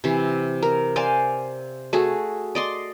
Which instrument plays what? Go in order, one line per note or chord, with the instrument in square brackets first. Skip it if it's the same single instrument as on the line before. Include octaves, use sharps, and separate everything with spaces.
[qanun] C3 E3
A#4
C5 D5 F5 G#5
A3 F#4 G#4
D5 D#5 C6